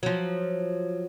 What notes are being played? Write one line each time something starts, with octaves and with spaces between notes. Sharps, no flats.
F3 F#3